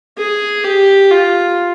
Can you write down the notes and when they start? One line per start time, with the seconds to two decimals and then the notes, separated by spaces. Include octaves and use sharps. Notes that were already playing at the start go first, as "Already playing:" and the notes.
0.18 G#4
0.64 G4
1.11 F4